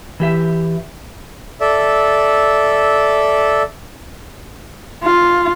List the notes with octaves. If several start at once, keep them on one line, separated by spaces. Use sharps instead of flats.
E3 G4 E5
A4 D5 E5
F4